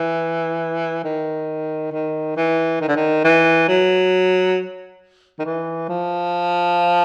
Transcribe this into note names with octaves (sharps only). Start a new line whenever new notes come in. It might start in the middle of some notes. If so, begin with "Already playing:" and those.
Already playing: E3
D#3
D#3
E3
D#3
D3
D#3
E3
F#3
D#3
E3
F3